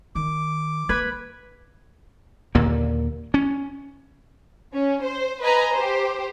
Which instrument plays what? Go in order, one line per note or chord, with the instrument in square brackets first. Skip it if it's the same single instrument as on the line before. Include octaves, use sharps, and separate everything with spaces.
[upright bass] D#3 [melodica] D6
[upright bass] A#3 C4 [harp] B4 B5 G#6
[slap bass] D#2 A#2 D3 A#3
C#4
[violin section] C#4
C5
B4 D#5 G#5 A#5
G4 C5